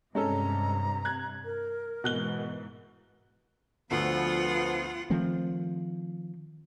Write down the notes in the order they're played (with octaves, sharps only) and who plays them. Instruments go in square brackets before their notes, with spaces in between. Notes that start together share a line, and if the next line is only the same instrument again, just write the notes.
[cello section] G2 C3 [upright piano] G#3 C#4 A4 [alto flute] A#5
[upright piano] F#6 G#6
[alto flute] A#4
[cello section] G#2 E3 [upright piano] B2 F#6 G7
[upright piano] D2 D3 A3 [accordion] F3 B3 [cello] F4 F#5
[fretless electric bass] D#3 F3 A3 C4